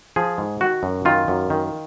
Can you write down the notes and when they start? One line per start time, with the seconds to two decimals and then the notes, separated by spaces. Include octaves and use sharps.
0.16 F3 G#4
0.38 G#2
0.61 D#3 F#4
0.83 F#2
1.05 D#3 F4
1.28 F#2
1.50 D#3